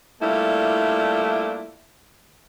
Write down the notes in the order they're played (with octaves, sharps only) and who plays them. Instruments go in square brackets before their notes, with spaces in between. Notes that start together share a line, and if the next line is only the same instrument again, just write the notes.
[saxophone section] G3 A3 A#3 D4 E4 F4